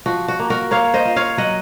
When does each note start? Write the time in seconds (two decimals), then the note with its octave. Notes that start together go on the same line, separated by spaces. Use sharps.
0.06 F3 F#4
0.28 F#4
0.39 A#3
0.50 F#4 A#4
0.71 A#3 C#5 F5
0.94 C5 D#5
1.05 F4
1.16 C#5 F5
1.37 F#3 D#5 F#5